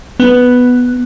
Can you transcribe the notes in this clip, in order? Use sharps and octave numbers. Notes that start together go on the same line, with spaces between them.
B3